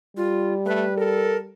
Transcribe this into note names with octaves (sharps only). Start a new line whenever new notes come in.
G3 F4
A3 B4
A4 A#4